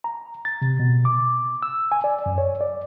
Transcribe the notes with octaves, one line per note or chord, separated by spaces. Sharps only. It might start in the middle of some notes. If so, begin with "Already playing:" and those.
A#5
A6
C3
B2
D6
E6
G#5
D5
F#2
C#5
D5